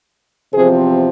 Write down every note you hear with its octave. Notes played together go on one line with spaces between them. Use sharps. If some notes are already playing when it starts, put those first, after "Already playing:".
E2 C3 F3 C4 G#4 C5